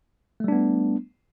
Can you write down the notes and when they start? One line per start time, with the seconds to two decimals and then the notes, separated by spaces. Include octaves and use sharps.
0.40 A3
0.44 G3
0.48 D4
0.52 B3